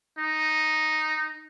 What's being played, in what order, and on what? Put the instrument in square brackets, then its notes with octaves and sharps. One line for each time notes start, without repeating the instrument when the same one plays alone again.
[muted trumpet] D#4